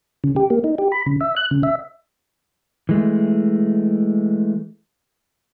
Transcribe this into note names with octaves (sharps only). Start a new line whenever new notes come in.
C#3
G4
A#3
D#4
G4
B5
C#3
E5
F#6
C#3
E5
E3 G#3 A3